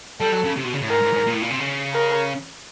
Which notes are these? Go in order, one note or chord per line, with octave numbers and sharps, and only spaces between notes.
G3 A4
F#3
C#3
C3
B2
C#3
A2
G#2 A#4
G#2
G#2
A#2
A2
A#2
C3
C#3
A#4